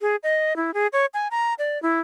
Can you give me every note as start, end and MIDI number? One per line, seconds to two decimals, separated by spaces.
0.01 0.16 68
0.23 0.56 75
0.56 0.74 64
0.74 0.87 68
0.93 1.06 73
1.14 1.28 80
1.31 1.54 82
1.59 1.81 74
1.83 2.00 64